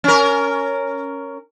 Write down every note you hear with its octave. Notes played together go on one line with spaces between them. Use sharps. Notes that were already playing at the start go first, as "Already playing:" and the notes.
C#4 A#4